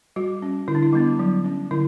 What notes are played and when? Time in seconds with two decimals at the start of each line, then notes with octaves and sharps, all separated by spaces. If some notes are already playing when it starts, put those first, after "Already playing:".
0.16 G3 F#4
0.42 C#4
0.68 D3 E4
0.75 D4
0.83 E4
0.93 G3 B3 D4
1.19 F#3
1.44 C#4
1.71 D3 E4